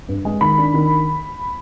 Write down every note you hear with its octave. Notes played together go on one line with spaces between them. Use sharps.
G2
G#3
D#3 B5
D4
D#3